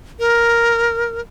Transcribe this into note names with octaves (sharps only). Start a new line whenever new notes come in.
A#4